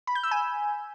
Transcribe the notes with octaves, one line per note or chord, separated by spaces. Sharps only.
B5
G6
E6
G#5